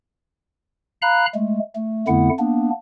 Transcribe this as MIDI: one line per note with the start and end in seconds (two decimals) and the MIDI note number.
1.02 1.26 77
1.02 1.26 82
1.02 1.26 83
1.02 1.26 90
1.34 1.59 56
1.34 1.59 57
1.75 2.05 57
2.08 2.29 41
2.08 2.29 50
2.08 2.29 57
2.08 2.29 59
2.08 2.29 64
2.08 2.29 78
2.39 2.70 58
2.39 2.70 59
2.39 2.70 62